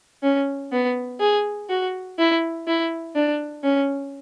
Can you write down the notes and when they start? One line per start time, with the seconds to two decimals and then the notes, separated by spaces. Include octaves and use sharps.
0.23 C#4
0.72 B3
1.20 G#4
1.69 F#4
2.19 E4
2.67 E4
3.16 D4
3.64 C#4